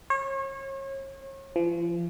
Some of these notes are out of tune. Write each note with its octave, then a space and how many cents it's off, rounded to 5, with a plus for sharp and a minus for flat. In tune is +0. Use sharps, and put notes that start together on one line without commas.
C#5 -35
F3 -40